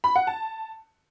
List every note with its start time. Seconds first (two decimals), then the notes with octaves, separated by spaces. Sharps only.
0.04 B5
0.16 F#5
0.27 A5